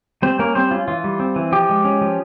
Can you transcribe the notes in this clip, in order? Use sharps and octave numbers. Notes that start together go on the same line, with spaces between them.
G3 C4 C5
A#3 C#4 A#4
G3 C4 C5
C#4 F4
E3 F4
G3
C4
E3
F3 G4
G#3
C#4
F3